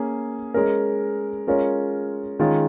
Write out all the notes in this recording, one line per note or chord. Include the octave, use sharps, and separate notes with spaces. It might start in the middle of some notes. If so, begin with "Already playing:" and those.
Already playing: A#3 C#4 G#4
G#3 C#4 A#4
G#3 C#4 F4 A#4 C#5
D#3 G#3 C#4 F4